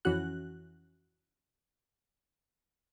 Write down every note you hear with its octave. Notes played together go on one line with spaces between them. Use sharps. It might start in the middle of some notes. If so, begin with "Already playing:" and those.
F2 E3 C#4 F#4 F#6